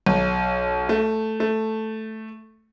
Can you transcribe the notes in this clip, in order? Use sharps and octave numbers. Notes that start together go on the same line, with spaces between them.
B1
A3
A3